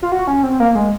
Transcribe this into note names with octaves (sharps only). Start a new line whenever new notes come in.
F4
F#4
C#4
C4
A#3
G#3